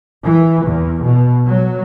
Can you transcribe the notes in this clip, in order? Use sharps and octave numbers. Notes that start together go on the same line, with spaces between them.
E3
E2
B2
F#3